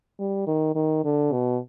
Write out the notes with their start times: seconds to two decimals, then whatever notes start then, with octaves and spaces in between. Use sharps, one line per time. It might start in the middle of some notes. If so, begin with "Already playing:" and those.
0.19 G3
0.47 D#3
0.75 D#3
1.04 D3
1.33 B2